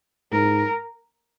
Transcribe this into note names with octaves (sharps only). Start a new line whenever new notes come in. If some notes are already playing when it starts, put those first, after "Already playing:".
G#2 A#4